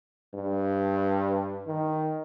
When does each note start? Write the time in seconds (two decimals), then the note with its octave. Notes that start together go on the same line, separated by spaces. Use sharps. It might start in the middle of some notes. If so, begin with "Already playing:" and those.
0.34 G2
1.67 D#3